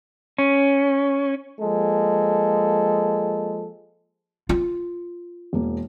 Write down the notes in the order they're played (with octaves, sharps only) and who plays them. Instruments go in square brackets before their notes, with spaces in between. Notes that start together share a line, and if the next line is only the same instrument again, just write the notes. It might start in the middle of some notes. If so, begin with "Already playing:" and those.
[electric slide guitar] C#4
[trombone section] F3 G#3 A#3 A4
[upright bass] F4
[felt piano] E1 A#3